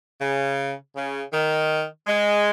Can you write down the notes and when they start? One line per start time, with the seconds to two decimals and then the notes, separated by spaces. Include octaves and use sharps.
0.21 C#3
0.96 C#3
1.32 D#3
2.07 G#3